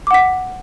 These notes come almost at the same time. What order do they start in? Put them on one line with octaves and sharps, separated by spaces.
D6 F#5 B6